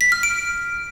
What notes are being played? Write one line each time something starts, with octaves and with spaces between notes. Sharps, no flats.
B6
F6
D7